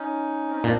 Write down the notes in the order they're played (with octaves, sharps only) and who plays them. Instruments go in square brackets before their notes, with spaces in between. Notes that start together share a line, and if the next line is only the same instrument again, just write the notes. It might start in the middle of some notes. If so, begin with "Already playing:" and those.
Already playing: [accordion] C#4 D#4
C4
C#4
[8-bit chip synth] A#2 [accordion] C4 D4